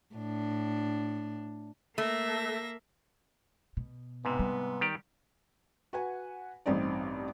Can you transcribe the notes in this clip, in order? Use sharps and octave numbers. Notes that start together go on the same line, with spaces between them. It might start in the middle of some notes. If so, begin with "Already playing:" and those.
A2 D4
A3 A#3 E5 A#6
B2
G#2 C3 B3
G3
D#3 G4 D5
F#4 B4 F#5 G#5
A1 G2 C4 D#4 D5